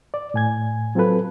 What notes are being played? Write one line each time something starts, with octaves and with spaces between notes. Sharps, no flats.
D5
A2 G#5 G#6
F#3 C4 F4 A4 B4